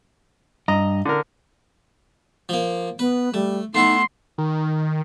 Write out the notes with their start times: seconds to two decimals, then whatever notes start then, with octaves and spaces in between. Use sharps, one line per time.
0.68 G2 D#5 A#5
1.05 D3 A#4
2.49 F3 A#3
2.99 B3 B4
3.34 G3 A3
3.74 A3 B3 D#4 E4 C6
4.38 D#3